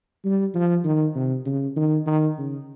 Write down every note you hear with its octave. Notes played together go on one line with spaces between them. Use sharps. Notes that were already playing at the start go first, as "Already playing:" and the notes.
G3
F3
D#3
C3
C#3
D#3
D#3
C#3